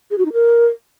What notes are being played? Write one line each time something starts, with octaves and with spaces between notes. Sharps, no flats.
G#4
F#4
D#4
A#4